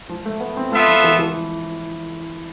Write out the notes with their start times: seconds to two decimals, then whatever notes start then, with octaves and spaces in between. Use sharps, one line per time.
0.09 F3
0.26 A3
0.40 B3
0.57 C4
0.72 A3 B3 F4 A4 E5
0.88 F3
1.04 E3
1.19 E3